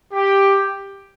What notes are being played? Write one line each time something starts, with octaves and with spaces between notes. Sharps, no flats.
G4